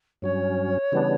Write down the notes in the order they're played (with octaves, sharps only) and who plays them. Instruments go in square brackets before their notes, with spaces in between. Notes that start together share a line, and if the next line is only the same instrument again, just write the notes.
[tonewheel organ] G2 F#3 C#4 [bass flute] C#5
[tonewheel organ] C#3 E3 G3 B3 D4